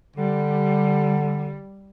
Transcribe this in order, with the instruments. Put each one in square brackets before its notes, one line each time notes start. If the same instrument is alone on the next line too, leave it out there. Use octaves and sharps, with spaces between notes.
[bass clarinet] D3 [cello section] G3